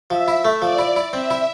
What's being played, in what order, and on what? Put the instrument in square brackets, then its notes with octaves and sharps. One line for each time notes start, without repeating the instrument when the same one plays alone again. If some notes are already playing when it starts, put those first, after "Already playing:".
[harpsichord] F3 [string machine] E5
[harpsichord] E4
A3
[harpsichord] F3 [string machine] D5
[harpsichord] E4
E4
[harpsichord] C4 [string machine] E5
[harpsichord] E4